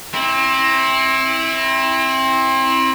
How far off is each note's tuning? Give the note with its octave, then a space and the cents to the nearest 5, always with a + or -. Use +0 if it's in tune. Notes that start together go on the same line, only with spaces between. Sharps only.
C4 +25 E4 -15